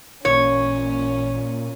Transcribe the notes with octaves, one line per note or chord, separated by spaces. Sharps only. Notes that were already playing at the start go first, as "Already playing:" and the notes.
A1 A#2 C#4 C#5